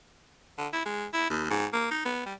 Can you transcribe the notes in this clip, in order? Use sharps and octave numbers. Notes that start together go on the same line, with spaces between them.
D3
E4
G#3
E4
D#2
G#2
A#3
D#4
B3
G3